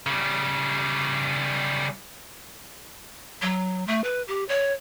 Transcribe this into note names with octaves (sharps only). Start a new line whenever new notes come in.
C#3 G3
F#3
A3
B4
G4
C#5